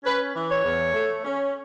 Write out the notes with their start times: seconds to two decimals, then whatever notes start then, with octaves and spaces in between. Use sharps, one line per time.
0.04 C#4 B4
0.34 E3
0.49 C#5
0.64 E2
0.93 A3
1.25 C#4